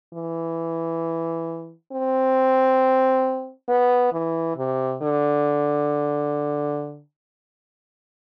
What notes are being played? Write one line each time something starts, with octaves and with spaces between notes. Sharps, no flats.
E3
C4
B3
E3
C3
D3